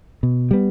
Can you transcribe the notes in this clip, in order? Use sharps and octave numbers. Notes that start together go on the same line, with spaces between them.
B2
G3 B3